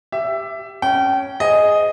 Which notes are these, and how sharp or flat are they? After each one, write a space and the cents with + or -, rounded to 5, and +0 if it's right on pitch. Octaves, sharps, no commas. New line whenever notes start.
G4 +0 E5 +15
C#4 +0 G5 -30
G#4 +0 C5 -30 D#5 +0